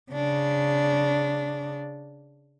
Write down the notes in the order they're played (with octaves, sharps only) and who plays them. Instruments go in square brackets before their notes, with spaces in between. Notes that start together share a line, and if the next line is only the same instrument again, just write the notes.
[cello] C#3 D4